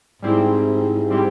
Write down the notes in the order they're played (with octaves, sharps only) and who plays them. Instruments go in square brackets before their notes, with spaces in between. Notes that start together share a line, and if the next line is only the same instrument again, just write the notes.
[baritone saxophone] G#2 [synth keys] G3 C4 E4 G4
[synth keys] G3 C4 E4 G4